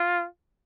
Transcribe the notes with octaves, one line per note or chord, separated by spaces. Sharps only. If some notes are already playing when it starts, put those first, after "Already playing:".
Already playing: F4